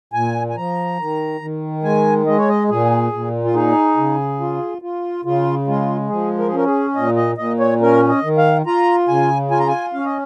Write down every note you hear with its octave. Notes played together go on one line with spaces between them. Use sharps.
A#2 G#5
G#5
F3 A#5
D#3
D#3
G#3 G#5
G#3 D#5
C#5
D#5
A#2 G#4
A#2
F4
D#4 G#4
C#3
F4
F4
C#3 F4
G#3 F4
F3 G#4
A#4
G#4
C#4 A#4
G#4
A#2 D#5
D#5
A#2 D#5
C#5
C#4 A#4
D#5
D#3
F5
F4 A#5
C#3 G#5
F4 G#5
A#5
G#5
C#4 F5
D#5